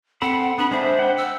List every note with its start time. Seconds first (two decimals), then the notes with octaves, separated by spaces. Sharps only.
0.22 C4 A4 F#5 B5
0.58 B3 D4 B5
0.71 G#3 D4 C5 E5
0.99 F#5 G5
1.17 E6